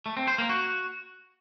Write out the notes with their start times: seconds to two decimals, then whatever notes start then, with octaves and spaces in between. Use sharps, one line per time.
0.06 A3
0.17 C4
0.28 C5
0.38 A#3
0.49 F#4